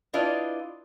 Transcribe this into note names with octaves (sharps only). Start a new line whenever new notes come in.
D4 E4 F4 B4 D5 D#5